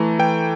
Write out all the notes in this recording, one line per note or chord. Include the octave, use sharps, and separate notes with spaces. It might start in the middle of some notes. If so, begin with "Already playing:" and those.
Already playing: E3 A3 A#5
E3 G5